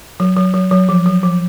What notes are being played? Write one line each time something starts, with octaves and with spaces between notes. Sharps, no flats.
F#3
F#3
F#3
F#3
F3
F#3
F3